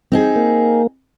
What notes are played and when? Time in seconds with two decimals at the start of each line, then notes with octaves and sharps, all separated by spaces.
0.12 C4 D#4 G#4
0.36 A#3